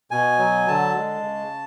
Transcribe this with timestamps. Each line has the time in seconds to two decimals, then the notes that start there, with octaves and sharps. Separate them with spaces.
0.11 B2 G#5
0.39 F#3
0.68 D3 A5
0.95 G#3
1.23 C#3